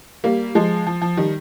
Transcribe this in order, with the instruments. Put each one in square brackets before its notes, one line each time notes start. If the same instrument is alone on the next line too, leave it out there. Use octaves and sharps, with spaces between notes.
[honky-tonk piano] G3 A#3
F3 G#3
F3
F3
D#3 G3